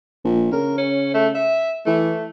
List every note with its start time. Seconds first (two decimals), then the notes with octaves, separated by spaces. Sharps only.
0.24 A#1
0.52 C#3 A#4
0.78 C#4
1.14 A3
1.35 E5
1.86 E3 A3